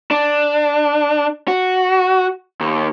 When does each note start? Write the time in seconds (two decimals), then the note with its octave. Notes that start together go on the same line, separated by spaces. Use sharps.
0.11 D4
1.48 F#4
2.61 D#2